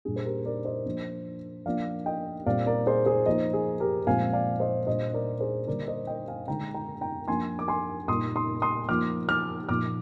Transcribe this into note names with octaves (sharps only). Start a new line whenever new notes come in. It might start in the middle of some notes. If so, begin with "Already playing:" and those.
A#2 G3 D4 G#4
C5
G4 A#4
A#4 D5
C5 D#5
F3 A#3 D4
F3 A#3 D4 D5 F5
D#5 G5
A#2 G3 C4 D5 F5
A#4 D5
G#4 C5
G#4 C5
F3 A#3 D#4 C5 D#5
G#4
G4 A#4
A#2 F3 G#3 C4 F5 G#5
D5 F5
C5 D#5
A#2 G3 D4 C5 D#5
A#4 D5
G#4 C5
D3 G3 A#3 A#4 D5
C5 D#5
D#5 G5
F5 G#5
D3 G#3 D#4 G5 A#5
G5 A#5
G5 A#5
F3 A#3 D4 G#5 C6
D6
G#5 C6
A#2 G3 A#3 D#4 C6 D#6
C6 D#6
C6 D#6
F3 A#3 D#4 D6 F6
D6 F6
A#2 F3 A#3 D#4 D6 F6